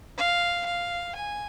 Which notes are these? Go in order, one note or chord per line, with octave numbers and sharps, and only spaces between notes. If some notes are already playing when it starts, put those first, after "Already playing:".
F5
F5
G#5